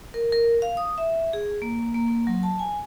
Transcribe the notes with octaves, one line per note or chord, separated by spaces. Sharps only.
A#4
A#4
F5
D#6
E5
G#4
A#3
A#3
A#3
F#3
A5
G#5